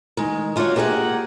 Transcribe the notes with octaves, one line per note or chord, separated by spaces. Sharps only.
D#3 G#3
D4 F4 F#4 B4 C#5
A#3 G4 G#4 C#5 F#5